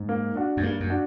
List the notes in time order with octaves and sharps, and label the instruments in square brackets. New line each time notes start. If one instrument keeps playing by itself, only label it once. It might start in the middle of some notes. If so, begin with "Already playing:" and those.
Already playing: [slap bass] G#2
[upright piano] A#3
D4 F#4
[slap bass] F#2
[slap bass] G2 [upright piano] A#3
[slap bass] F#2
[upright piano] D4 F#4